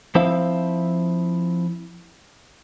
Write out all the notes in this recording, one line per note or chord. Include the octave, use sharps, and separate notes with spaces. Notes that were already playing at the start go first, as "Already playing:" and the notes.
F3 C4 E4 C5 E5 F5